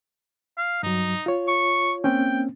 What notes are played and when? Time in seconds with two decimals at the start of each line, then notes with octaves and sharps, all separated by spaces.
0.57 F5
0.83 G2 F#3 D#4
1.26 F4 C#5
1.48 C#6
2.04 A#3 C4 C#4 G5